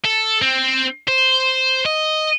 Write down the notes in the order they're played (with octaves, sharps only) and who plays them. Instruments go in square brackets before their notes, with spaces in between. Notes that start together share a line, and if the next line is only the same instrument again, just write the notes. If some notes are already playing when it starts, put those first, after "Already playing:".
[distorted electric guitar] A4
C4
C5
D#5